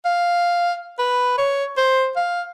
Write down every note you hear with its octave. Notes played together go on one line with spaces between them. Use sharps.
F5
B4
C#5
C5
F5